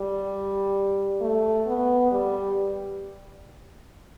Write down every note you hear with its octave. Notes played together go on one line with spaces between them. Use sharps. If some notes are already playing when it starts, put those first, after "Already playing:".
Already playing: G3
A3
B3
G3